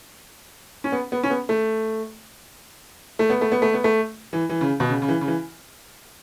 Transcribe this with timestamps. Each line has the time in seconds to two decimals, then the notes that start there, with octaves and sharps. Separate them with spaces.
0.84 C#4
0.92 B3
1.12 B3
1.24 C#4
1.30 B3
1.49 A3
3.19 A3
3.30 B3
3.41 A3
3.52 B3
3.62 A3
3.74 B3
3.84 A3
4.33 E3
4.49 E3
4.61 C#3
4.80 B2
4.89 C#3
5.02 C#3
5.08 E3
5.21 C#3
5.28 E3